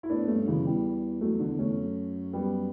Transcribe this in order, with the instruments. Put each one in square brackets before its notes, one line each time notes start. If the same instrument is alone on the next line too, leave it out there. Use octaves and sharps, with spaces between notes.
[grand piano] E4
[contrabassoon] A2 [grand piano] B3 D4
[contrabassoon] G2 [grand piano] A3 C#4
[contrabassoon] F#2 [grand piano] C#3 E3
[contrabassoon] E2 [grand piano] E3 G3
[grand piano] F#3 A3
D3
A3 C#4
[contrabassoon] F#2
[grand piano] G3 B3